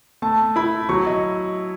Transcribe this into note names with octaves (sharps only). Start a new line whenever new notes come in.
A3 A5
E4 B5
F#3 C#6
D#5